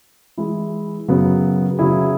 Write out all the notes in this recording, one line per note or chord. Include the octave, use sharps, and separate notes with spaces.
E3 G#3 E4
F#2 C#3 F#3 B3
C#3 F#3 E4 G#4